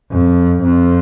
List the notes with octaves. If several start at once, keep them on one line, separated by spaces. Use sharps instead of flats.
F2
F2